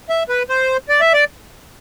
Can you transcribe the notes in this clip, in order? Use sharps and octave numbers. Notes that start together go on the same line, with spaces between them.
E5
B4
C5
D5
E5
D5